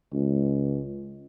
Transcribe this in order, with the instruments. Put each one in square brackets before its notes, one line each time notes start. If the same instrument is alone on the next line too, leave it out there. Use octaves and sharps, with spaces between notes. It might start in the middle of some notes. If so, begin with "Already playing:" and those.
[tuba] C#2